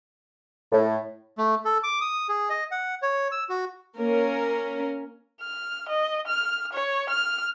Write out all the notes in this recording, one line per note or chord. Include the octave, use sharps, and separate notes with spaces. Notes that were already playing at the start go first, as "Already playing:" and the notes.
A2
A3
A4
D6
D#6
G#4
D#5
F#5
C#5
E6
F#4
A#3 C#4 A#4
F6
D#5
F6
C#5
F6